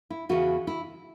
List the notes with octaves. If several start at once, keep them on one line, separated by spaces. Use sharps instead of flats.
E4
E2 C#3 E3 F#4
E4